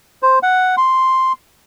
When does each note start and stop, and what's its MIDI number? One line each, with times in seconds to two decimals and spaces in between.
0.23 0.39 72
0.43 0.76 78
0.77 1.33 84